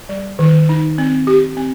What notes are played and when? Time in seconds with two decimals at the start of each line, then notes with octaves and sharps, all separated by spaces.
0.09 G3
0.39 D#3
0.69 D#4
0.98 C4
1.27 G4
1.57 C4